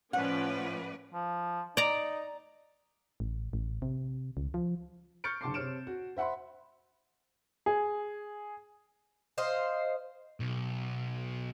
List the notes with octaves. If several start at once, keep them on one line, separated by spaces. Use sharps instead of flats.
A2 F3 C#4 B4 D5 F#5
F3
D#4 D5 A#5
A1
A1
C3
C#2
F3
C#6 F6 G6 A6 C#7 D7
F#1 D3 A5 C6 D6 C7
C3 C4 C#5 F6 D7 E7
F#4
C5 E5 F#5 B5 C6
G#4
C5 D#5 F5
B1 B2